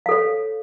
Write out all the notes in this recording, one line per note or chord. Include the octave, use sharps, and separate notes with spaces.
A4 C#5 F5